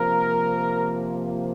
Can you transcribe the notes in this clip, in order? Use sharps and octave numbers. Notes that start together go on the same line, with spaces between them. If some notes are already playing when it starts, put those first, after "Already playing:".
Already playing: C3 F3 A#3 A#4